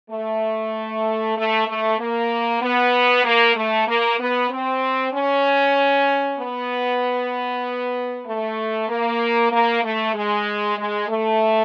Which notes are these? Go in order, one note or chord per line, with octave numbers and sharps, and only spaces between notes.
A3
A3
A3
A#3
B3
A#3
A3
A#3
B3
C4
C#4
B3
A3
A#3
A#3
A3
G#3
G#3
A3